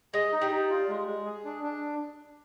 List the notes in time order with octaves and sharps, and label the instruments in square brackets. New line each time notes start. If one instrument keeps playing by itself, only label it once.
[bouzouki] G#3 [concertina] D#5
[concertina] D#4
[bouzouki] G3
[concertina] D#4
F4
G#3
G#3
G#4
D4
D4